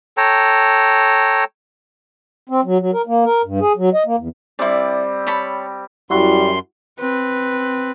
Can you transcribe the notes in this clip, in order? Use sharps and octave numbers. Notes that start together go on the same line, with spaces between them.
A4 C#5 G5 A#5
C4
F#3
F#3
A#4
A#3
A#4
G2
G#4
F#3
D#5
A#3
E2
G3 C4 E4 D5
C#5 A5 B5
F#2 G3 E4 F#4 C6
C4 B4